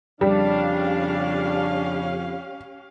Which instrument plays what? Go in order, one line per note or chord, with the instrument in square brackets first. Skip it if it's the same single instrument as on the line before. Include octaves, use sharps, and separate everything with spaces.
[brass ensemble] F2 C#3 [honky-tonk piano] G3 [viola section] C#4 G4 F5 [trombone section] D4